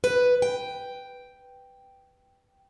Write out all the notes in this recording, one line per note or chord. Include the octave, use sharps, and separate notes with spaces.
B4
G5